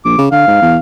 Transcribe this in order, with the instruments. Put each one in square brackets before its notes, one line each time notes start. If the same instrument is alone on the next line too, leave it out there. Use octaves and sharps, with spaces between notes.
[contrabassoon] A#1 [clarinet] D6
[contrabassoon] C#3
[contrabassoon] D3 [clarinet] F5
[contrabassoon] G#2
E2